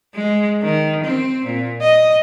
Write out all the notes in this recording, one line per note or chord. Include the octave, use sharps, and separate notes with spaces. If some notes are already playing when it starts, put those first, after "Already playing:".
G#3
D#3
C4
A#2
D#5